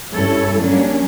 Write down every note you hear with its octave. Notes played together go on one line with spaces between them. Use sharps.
G2 C#4 E4 A4 C#5
F#3 G3 A#3 C#4 D4